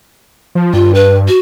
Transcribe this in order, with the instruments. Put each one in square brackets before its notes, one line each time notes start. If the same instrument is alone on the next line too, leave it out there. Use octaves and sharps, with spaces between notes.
[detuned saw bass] F3
[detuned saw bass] G2 [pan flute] F4
[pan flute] B4
F#4